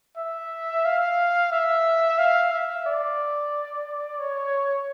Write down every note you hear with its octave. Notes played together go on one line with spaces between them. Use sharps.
E5
F5
E5
F5
E5
D5
C#5